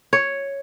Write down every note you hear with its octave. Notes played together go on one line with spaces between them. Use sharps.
C#5